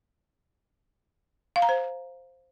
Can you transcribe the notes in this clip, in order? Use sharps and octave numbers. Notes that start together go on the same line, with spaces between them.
F5
A#5
C5